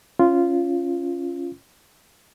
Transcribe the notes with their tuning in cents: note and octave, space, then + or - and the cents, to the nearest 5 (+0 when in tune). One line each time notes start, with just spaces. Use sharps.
C#4 +0 F4 -10